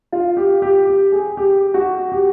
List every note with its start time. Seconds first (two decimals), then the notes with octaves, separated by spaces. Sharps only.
0.12 F4
0.37 G4
0.62 G4
0.87 G4
1.12 G#4
1.37 G4
1.74 F#4
2.12 G4